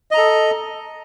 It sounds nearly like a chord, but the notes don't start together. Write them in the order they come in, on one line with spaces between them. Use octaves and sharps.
D#5 A#5 A4